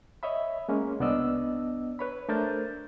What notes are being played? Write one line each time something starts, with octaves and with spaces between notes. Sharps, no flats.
C#5 D#5 E5 B5
G#3 A#3 C#4
C2 B3 D4 D5 D#5 E6
B4 C#5 B5
A3 D4 A#4 C5 G6 A6